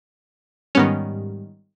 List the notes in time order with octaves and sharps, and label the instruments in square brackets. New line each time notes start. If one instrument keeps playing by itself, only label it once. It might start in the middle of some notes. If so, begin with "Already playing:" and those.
[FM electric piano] G#2 G3 [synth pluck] D#3 B3 C#4